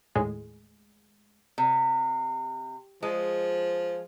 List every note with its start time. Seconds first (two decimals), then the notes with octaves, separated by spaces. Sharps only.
0.15 D#2 A2 G#3
1.58 C3
3.03 F3 G#3